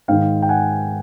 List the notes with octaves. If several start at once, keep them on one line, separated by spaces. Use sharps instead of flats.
G#2 D#3 F5 G5
G5
F#5 G#5